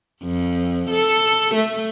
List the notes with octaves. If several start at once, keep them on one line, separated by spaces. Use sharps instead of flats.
F2
A4
A3